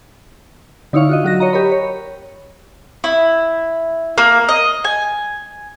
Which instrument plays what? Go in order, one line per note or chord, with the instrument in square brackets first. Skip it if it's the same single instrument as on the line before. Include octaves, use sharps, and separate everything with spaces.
[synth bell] D3 D#4 E4 C#5 F5 C#6
F4 F#4 D#5
F#3 F#4 A#6
C#5 D#5 A#5
G4 A#4 C#5 B5
C#5
[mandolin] E4
A#3
D#5
G#5